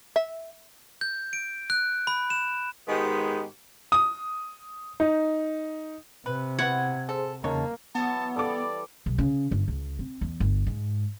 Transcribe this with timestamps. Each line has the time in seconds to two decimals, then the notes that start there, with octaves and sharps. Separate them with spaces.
0.16 E5
1.01 G6
1.33 D7
1.70 F#6
2.07 B5
2.30 E7
2.88 G#2 D#3 G#3 B3 G4
3.92 D#6
5.00 D#4
6.26 C3 B4
6.59 B3 E4 F#4 F#5 G#6
7.09 G#4 A4 C5
7.44 E2 C#3 G#3 A#3 D#4 C#5 A5
7.95 E3 F#3 B3 E4 A5
8.36 G3 A4 D5 D6
9.06 B1
9.18 C#3
9.51 G1
9.68 C#2
9.99 C4
10.21 E2
10.40 G1
10.67 G#2